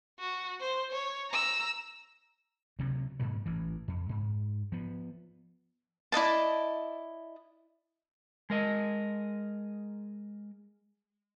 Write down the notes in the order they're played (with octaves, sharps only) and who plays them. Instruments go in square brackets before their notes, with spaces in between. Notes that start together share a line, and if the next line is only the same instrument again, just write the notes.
[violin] F#4
C5
C#5
A#5 E6
[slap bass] D2 C3 F#3
G#2 B2 D3 F#3
A1 E3
F2
G#2
F3 B3
[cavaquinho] E4 D5 D#5 A5
[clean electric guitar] G#3 A#4 D#5